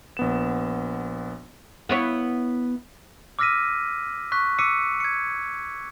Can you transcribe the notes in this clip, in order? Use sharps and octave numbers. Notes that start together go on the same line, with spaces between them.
A#1 B3 E7
B3 E4 C#5
D6 E6 F6 A#6 B6 D#7
C#6 F#6 B6
D6 E6 B6 C#7 D#7
G#6 C#7